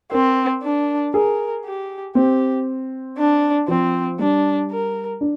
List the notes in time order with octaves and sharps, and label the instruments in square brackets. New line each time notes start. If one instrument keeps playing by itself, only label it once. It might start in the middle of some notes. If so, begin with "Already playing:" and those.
[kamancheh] C4 [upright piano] A#4
[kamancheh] D4
[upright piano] G#4 [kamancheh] A#4
[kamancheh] G4
[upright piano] C4 [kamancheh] G4
[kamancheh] D4
[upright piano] F3 [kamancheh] C4
[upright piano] G3 [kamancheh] D4
[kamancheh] A#4
[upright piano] D4